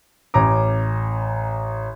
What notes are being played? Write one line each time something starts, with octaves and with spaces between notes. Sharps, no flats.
A1 C#4 A#5 D6